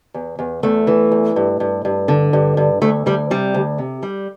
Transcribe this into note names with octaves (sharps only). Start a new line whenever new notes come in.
E2
E2
E2 A3
E3
E2
G2
G2
G2
D3
G2
G2
D2 A3
D2 G3
C3 G3
D2
C3
G3